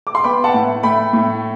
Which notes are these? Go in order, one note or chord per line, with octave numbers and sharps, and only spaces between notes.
D6
C6
B3 G5 B5
F#5 A5
A2
A3 G5 B5
A2